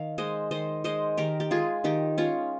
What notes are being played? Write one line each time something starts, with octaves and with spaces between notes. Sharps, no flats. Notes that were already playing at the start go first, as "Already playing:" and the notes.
Already playing: D#3 F5
G#3 C5 D#5
D#3 C5 D#5
G#3 C5 D#5
D#3 G4 A#4
G4
G#3 F4 G#4
D#3 D#4 G4
G#3 C#4 F4